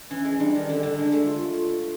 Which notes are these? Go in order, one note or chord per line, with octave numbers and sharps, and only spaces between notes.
E3 C#4
G#3
G3 D4
D#3
D3 D4
D3
G#3
A3
F4